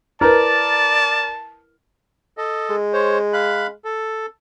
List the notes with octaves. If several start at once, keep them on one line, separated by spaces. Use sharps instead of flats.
E4 A#4 B4 D5 A5
A4 D#5
G#3
C5 C#5
F5 B5 F#6
A4